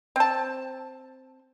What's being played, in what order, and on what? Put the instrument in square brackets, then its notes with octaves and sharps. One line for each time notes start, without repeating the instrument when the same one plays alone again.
[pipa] C4 A5